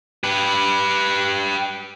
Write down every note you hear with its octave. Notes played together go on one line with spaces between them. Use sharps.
G4 B4